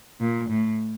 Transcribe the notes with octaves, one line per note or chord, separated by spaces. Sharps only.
A#2
A2